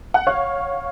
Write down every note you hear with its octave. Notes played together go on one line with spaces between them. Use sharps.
F#5
C#5 F5